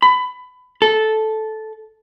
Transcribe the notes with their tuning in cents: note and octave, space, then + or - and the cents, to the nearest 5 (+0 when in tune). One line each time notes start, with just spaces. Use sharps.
B5 +20
A4 -10